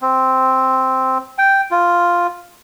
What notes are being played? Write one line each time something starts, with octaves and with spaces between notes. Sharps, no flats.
C4
G5
F4